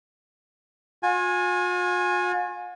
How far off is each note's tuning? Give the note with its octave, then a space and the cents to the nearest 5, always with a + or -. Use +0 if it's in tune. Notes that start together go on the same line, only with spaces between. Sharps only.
F4 +45 G#5 +0